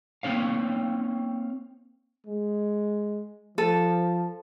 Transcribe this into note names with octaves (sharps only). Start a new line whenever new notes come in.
A#3 C4 C#4 C#5 F5
G#3
F3 A4